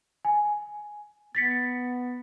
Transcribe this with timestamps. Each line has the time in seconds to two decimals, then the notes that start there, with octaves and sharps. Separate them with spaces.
0.25 G#5
1.35 B3 A6 B6 C#7